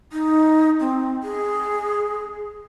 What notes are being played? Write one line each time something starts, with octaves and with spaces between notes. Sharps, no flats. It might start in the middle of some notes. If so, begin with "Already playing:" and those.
D#4
C4
G#4